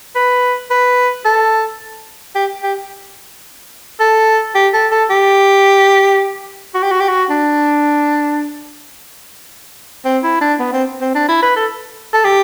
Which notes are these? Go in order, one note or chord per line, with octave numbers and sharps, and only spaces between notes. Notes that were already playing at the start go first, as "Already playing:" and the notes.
B4
B4
A4
G4
G4
A4
G4
A4
A4
G4
F#4
G4
F#4
G4
F#4
D4
C4
E4
D4
B3
C4
C4
D4
E4
B4
A4
A4
G4